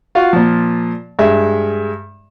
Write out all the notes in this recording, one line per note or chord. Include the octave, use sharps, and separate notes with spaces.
F4 F#4 F5 F#5
A#2 F3
G2 G#3 E5